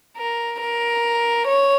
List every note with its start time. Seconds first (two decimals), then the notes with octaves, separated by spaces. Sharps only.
0.16 A#4
0.60 A#4
1.47 C#5